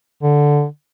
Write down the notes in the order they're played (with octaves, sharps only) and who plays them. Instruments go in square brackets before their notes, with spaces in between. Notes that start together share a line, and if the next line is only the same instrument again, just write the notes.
[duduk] D3